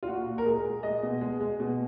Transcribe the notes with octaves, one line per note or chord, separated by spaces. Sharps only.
F4
A#2 F#4
A#2
A#4
G#3 G#4
G#3
G#3 D#5
B2
G#3
G#3
B2